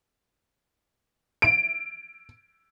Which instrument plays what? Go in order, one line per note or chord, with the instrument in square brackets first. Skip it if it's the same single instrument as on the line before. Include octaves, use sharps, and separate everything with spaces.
[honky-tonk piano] D7